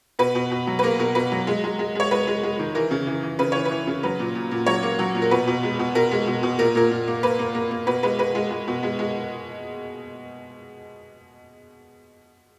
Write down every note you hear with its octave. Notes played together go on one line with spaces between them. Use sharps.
B2 B4
B2
B2
F#3
B4
A#3 A#4
B2 A#4
B2 B4
F#3
G#3
G#3
G#3
G#3 C#5
G#3 B4
G#3
G#3
D#3
E3 A#4
C#3
E3
E3
C#3 B4
E3 C#5
B4
E3
C#3
F#3 B4
A#2
A#2
A#2
F#3 C#5
A#3
F#3
A#2
A#4
B2 B4
B2
G#3
B2
B2 A#4
G#3
B2
B2
A#2 A#4
A#2 A#4
A#2
A#3
A#3 B4
A#3
A#3
A#3
B2 B4
G#3 B4
G#3 B4
G#3
G#3
B2
G#3
G#3